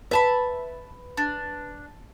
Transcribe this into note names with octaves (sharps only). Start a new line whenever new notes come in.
B4 E5 A5 B5
D4